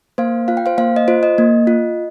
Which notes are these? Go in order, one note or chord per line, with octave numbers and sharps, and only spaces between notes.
A#3 C5 F5
F4 F5
G5
C5 F5
A#3 C5 F5
D#5
F4 C5
D#5
A#3
F4